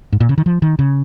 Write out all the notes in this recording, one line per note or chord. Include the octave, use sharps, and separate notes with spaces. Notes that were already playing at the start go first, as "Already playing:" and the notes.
G#2
A#2
C#3
D#3
F3
D#3
C#3